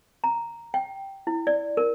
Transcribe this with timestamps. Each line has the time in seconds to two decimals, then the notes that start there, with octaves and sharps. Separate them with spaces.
0.24 A#5
0.74 G5
1.27 E4
1.47 D5
1.77 A#4